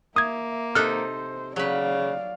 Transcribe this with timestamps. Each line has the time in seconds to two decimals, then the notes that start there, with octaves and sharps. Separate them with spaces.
0.16 A#3 E5 D#6 G#6
0.75 C3 D#4 A4 C5 F6 F#6
1.56 C#3 F#3 B4 D5 F5